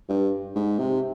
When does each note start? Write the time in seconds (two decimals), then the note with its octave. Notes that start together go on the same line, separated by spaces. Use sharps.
0.09 G2
0.56 G#2
0.79 C3